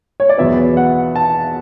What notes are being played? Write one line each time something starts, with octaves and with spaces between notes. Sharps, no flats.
C#5
D5
E2 B2 F#3 B3 E5
F#5
A5